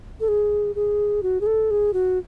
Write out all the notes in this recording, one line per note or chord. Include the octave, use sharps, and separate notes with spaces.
A4
G#4
G#4
F#4
G#4
A4
G#4
F#4